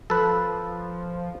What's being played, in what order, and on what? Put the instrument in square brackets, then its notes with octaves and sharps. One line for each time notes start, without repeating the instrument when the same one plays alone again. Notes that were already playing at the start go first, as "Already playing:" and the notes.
[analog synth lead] F3 [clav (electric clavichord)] A4 B4